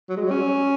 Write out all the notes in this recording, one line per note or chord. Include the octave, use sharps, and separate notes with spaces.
F#3
G#3
F#3
C#4